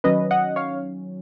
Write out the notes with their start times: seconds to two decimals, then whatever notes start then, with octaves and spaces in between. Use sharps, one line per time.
0.04 D#3 F#3 C#4 B4 D#5
0.31 D#5 F#5
0.56 C#5 F5